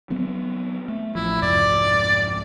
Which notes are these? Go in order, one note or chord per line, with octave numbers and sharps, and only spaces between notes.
F#3 B3 C4
A3
A1 F3 E4
C2 F2 G#2 D5